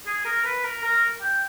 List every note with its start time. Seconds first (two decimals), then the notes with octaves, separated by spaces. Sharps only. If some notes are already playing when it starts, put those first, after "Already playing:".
0.07 G#4
0.25 A#4
0.45 B4
0.64 A#4
0.83 A#4
1.21 G5